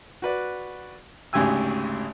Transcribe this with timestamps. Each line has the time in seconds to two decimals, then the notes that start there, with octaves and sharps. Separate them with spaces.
0.22 F#4 B4 D5
1.33 G#1 D2 C#3 G4 G#5 E6